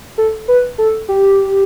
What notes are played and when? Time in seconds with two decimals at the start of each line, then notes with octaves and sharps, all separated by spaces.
0.18 A4
0.48 B4
0.78 A4
1.09 G4